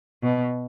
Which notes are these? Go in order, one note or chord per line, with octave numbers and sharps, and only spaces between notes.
B2